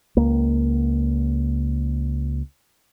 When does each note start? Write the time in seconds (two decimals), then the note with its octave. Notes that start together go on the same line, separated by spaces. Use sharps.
0.17 C#2 A#3